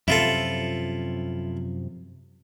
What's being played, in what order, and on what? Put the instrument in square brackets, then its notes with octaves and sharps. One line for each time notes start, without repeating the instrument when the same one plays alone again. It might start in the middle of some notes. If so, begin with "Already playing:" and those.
[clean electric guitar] F#2 C3 F3 [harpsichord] E4 F4 A4